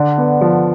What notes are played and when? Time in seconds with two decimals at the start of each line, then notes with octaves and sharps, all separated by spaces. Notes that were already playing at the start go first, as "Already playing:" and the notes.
Already playing: D3 D4
0.18 B3
0.41 F3